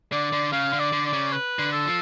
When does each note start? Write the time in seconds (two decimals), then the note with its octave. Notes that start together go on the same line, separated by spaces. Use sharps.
0.12 D3 D5
0.32 D3
0.52 C#3 F5
0.73 D3
0.80 D5
0.92 D3
1.06 D5
1.13 C#3
1.32 B4
1.59 D3
1.72 A4
1.86 F3